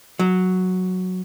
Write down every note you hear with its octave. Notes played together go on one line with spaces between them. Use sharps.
F#3